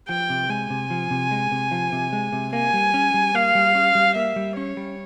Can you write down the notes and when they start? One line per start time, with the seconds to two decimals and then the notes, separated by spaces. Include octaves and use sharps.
0.09 F3 G5
0.30 C3
0.49 G#3 G#5
0.70 C3
0.90 F3
1.11 C3
1.31 G#3
1.52 C3
1.71 F3
1.92 C3
2.13 G#3
2.32 C3
2.53 A#3 G#5
2.74 G3
2.94 C#4
3.14 G3
3.34 A#3 F5
3.55 G3
3.75 C#4
3.95 G3
4.15 A#3 E5
4.36 G3
4.56 C#4 C#5
4.77 G3